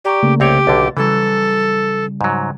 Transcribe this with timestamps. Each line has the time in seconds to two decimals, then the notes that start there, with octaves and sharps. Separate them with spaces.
0.05 G4 D5 A#5 C#6
0.23 C#3 A3 A#3
0.40 C2 C4 G4 C#5
0.67 B1 D3 A6
0.97 C#3 E3 F#3 G3 A4
2.21 G#2 F#3